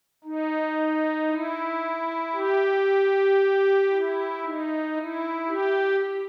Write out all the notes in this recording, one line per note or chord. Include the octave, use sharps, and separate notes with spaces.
D#4
E4
G4
E4
D#4
E4
G4